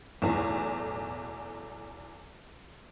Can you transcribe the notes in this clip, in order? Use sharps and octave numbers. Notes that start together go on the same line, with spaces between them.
B1 E2 A2